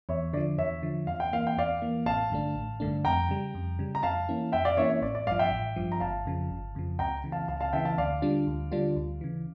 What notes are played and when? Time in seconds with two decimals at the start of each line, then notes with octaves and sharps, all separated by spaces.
0.09 E2 C#5 E5
0.33 D3 F3 D5
0.58 E2 C#5 E5
0.83 D3 F3
1.07 E2 F5
1.20 G5
1.32 E3 A#3 F5
1.47 G5
1.57 E2 D5 F5
1.82 E3 A#3
2.06 A1 F5 A5
2.30 G2 D3 A3 D4
2.56 A1
2.80 G2 D3 A3 D4
3.05 F2 G5 A#5
3.29 C#3 G3
3.55 F2
3.79 C#3 G3
3.95 A#5
4.03 F2 F5 A5
4.29 E3 A#3 C#4 E4
4.52 F2 E5 G5
4.65 D5 F5
4.77 E3 A#3 C#4 E4 C#5 E5
4.89 C#5 E5
5.02 A1 D5
5.15 D5
5.26 G2 F3 D5 F5
5.39 E5 G5
5.51 A1
5.76 G2 F3
5.92 A#5
6.00 G1 F5 A5
6.25 F2 C#3 F3
6.50 G1
6.75 F2 C#3 F3
6.99 C#2 G5 A#5
7.24 C#3 E3
7.32 F5 A5
7.48 C#2 F5 A5
7.61 F5 A5
7.73 C#3 E3 E5 G5
7.85 F5 A5
7.98 D2 D5 F5
8.22 D3 G3 D4 F4
8.47 D2
8.72 D3 G3 D4 F4
8.96 D2
9.21 C#3 E3